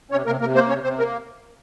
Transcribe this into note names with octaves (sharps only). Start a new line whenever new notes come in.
C3 C#4 C#5
C3 A#3 A#4
C3 A#3 A#4
A#3 C4 C5
C3 C#4 C#5
C3 C4 C5
A#3 A#4